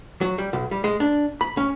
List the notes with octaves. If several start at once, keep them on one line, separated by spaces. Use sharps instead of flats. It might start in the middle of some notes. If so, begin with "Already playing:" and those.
F#3
G3
B1
G3
G#3
D4
B5
C#4